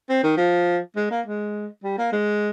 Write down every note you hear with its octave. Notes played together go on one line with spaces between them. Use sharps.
C4
D#3
F3
G#3
A#3
G#3
G3
A#3
G#3